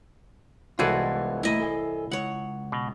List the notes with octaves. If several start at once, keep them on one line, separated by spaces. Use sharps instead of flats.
C2 E3 G#3 B3 F4 F#4 G#4 A4
A#2 A3 E4 D#5 A#5
A4 G#5
C#2 C#5 F#5
B2